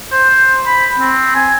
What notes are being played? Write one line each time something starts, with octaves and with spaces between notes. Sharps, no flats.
C5
B5
C4
G#5